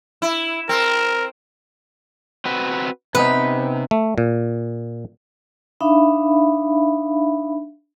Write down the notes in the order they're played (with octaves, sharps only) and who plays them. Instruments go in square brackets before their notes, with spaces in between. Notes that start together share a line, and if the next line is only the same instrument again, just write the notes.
[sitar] E4
[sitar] C4 [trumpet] A#4
[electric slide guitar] C4 F#4 B4
[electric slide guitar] C3 [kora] B3 C#4 D#4 [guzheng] B4
[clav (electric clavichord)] A3
A#2
[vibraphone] D4 D#4 E5 F5 B5